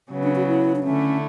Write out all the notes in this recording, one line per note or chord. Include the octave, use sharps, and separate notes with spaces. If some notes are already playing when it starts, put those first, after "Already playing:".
C#3 F#3 B3
D4
F#4
E4
D4
D3 A3 C#4 E4